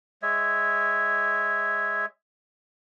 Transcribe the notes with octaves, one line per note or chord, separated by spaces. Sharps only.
G#3 C#5 E5